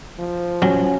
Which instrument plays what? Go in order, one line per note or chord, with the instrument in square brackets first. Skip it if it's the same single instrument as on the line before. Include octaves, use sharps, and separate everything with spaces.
[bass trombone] F3
[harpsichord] F#3 [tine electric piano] C#4